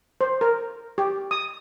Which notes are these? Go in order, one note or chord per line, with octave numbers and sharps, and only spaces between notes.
C5
A#4
G4
D#6